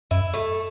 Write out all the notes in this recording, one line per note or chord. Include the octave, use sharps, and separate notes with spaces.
F#2 E4
A3